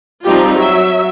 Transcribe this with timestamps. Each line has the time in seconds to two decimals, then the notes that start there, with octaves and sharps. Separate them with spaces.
0.25 F3 G3 C4 D#4 F4 G4
0.55 F#3 E5